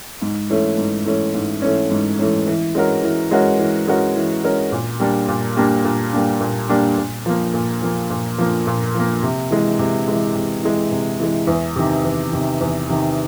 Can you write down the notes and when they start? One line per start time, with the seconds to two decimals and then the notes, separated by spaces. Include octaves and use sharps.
0.22 G#2
0.50 E3 A3 C#4
0.78 G#2
1.06 E3 A3 C#4
1.34 G#2
1.62 E3 A3 C#4
1.91 G#2
2.19 E3 A3 C#4
2.47 E3
2.75 G#3 C#4 F#4 A#4
3.03 E3
3.31 G#3 C#4 F#4 A#4
3.59 E3
3.88 G#3 C#4 F#4 A#4
4.16 E3
4.44 G#3 C#4 F#4 A#4
4.72 A#2
5.00 G3 A#3 D4
5.28 A#2
5.57 G3 A#3 D4
5.84 A#2
6.13 G3 A#3 D4
6.41 A#2
6.69 G3 A#3 D4
6.98 A#2
7.26 F3 A#3
7.54 A#2
7.82 F3 A#3
8.10 A#2
8.38 F3 A#3
8.67 A#2
8.94 F3 A#3
9.23 C3
9.51 E3 G#3
9.79 C3
10.08 E3 G#3
10.35 C3
10.63 E3 G#3
10.91 C3
11.20 E3 G#3
11.47 E2
11.76 C3 D#3
12.04 E2
12.32 C3 D#3
12.61 E2
12.89 C3 D#3